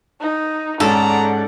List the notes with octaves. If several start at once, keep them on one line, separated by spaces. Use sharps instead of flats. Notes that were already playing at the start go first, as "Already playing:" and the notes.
D#4
G#2 C#4 A4 D5 F#5 A#5